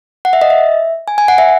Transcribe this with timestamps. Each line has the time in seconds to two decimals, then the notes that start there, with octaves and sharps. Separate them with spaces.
0.25 F#5
0.33 E5
0.41 D#5
0.50 E5
1.08 G#5
1.18 G#5
1.28 F#5
1.38 E5